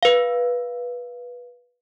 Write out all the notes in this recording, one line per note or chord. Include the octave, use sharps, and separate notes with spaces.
B4 F5